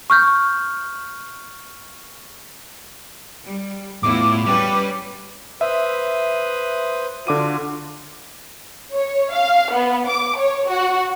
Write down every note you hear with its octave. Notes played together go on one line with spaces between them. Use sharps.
C#6 F6 G6
G3
E2 A2 E4 F4 D6
G3 C#4 G4 B4
B4 C5 E5 D#6
D3 F4 F#4 D6 D#7
C#5
F5
B3
D6
C#5
F#4